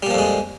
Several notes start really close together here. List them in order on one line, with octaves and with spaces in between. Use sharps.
G3 A#2 F3 F2 G#3